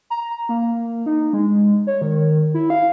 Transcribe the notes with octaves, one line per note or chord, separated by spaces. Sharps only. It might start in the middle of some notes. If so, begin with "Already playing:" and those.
A#5
A#3
D#4
G#3
C#5
D#3
E4
F5